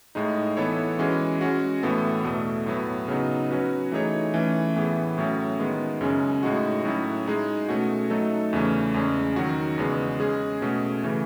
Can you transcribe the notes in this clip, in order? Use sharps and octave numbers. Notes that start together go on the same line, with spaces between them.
A2 G#3 D#4
E3 B3 E4 A4 C#5
E3 G#3 C#4 F#4
G#3 C#4 F#4
A2 E3 B3 E4 A4
E2 B2 A3
A2 F#3 B3
C#3 F#3 B3 D#4
F#3 C#4 F#4 B4
E3 A3 D#4 G#4 C#5
E3 A3 C#4
A2 E3 B3 E4 G#4
A2 F#3 C#4
D#3 G#3 B3
F#2 C#3 G#3 C#4
A2 G#3 D#4 F#4
A2 F#3 C#4 E4
G#3 D#4 G#4
B2 A3 C#4 F#4
F#3 A3 D#4 A4
E2 C#3 E3 A3 C#4
E2 C#3 G#3 C#4
D#3 F#3 C#4 F#4
E2 C#3 G#3 B3
G#3 C#4 G#4
B2 A3 C#4
C#3 E3 A3